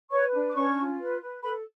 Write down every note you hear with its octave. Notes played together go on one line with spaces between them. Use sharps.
B4 C#5 C#6
D4
D6
C#4 C#5 C#6
F4
B4
B4
A4 B4 B5